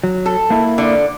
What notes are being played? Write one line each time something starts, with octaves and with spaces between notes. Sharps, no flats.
F#3
A4
A#3 E4
D3 F3